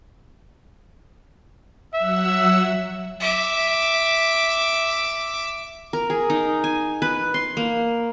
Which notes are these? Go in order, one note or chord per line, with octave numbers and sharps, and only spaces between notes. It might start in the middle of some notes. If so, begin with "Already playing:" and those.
F#3 E5 F#5 E6
E5 D6
A#4
G#4
D#4
G#5
B4
C6
A#3